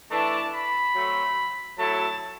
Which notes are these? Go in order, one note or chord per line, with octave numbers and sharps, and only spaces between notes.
E3 A3 D4 A5
B5
F#3 A3 C4
F#3 A3 E4 A5